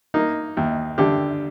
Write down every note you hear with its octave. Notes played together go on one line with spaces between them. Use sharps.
A#3 D#4
D#2
D3 G4